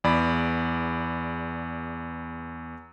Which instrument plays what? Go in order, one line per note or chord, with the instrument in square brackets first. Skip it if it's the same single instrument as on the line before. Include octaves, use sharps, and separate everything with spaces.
[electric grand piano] E2 D5 B5